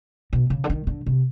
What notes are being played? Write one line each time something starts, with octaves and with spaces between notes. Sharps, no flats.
B2
C#3
D3
D#3
D3
C3